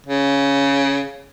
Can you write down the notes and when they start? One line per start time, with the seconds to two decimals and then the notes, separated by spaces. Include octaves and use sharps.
0.07 C#3